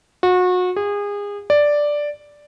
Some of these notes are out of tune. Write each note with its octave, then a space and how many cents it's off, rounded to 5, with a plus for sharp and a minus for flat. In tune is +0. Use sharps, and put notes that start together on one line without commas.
F#4 -30
G#4 -30
D5 +0